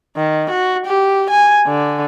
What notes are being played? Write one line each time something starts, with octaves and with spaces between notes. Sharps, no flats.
D#3
F#4
G4
G#5
D3